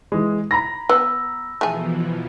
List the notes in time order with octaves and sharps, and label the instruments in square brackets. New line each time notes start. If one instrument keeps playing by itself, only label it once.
[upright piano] E3 G#3
A#5 B5 A#6
[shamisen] B3 [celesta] E6
[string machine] B2 E3 F3 [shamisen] A3 G#4